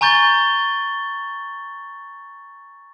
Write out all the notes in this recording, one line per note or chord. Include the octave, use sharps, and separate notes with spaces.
G#5 A#5 C#6 G6 A6 G7